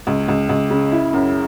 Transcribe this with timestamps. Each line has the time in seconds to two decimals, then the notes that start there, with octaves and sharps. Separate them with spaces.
0.07 C#2
0.28 C#2
0.49 C#2
0.70 C#3
0.92 E4
1.13 F#2